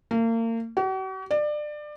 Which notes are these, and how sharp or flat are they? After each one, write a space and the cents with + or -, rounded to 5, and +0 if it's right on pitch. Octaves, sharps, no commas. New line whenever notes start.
A#3 -35
F#4 +45
D5 +25